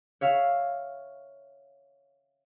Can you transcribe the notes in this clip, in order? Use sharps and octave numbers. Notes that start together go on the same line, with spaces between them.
C#5 E5 F5